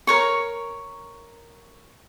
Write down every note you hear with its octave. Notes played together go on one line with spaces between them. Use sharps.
A#4 C#5 C#6